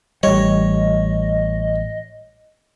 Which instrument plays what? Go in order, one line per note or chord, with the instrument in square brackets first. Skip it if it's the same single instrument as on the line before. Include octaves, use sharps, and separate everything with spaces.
[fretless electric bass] A1 G3 [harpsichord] C#5 [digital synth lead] D#5